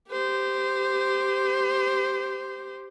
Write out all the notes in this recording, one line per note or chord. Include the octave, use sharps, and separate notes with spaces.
G4 C5